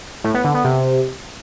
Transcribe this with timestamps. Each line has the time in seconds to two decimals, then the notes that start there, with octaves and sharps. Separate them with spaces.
0.24 A2
0.34 B3
0.44 D3
0.54 B3
0.64 C3